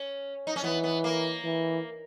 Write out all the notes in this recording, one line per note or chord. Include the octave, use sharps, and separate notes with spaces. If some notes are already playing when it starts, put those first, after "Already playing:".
Already playing: C#4
D#4
C#4
E3 B3
B3
A#3
E3